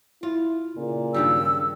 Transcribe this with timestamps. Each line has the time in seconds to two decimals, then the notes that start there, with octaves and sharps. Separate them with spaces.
0.23 E4 F4
0.77 A#2 C#3
1.14 G2 D#3 G3 E6